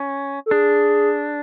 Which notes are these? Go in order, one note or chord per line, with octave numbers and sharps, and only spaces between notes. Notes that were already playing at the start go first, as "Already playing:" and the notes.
Already playing: C#4
A4
D4 G#4